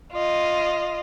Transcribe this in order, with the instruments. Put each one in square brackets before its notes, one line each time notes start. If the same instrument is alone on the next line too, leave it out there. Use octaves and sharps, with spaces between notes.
[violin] F4 D#5